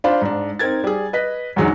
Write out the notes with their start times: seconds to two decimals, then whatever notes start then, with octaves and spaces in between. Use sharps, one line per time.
0.04 D4 F4 C5 B5
0.22 G#2 D4
0.59 C4 D#4 A#4 G#6 A6
0.84 G3 G#4
1.13 B4 D#5 B6
1.56 E2 G#2 D3 F#3 G#3 D#4